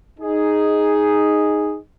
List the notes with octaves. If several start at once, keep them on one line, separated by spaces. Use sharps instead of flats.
D#4 G#4